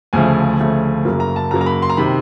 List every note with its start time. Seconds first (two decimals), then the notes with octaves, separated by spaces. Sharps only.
0.13 D2 C#3 F3 A3 G#5
0.60 D2 C#3 F3 A3
1.05 F#2 C#3 F#3 A#3
1.20 A#5
1.36 A5
1.51 F#2 C#3 F#3 A#3 A#5
1.61 A#5
1.66 B5
1.82 C6
1.90 A#5
1.97 C3 D#3 B5